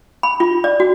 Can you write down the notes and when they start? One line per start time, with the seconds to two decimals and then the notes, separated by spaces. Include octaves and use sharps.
0.23 B5
0.40 F4
0.64 D5
0.80 F#4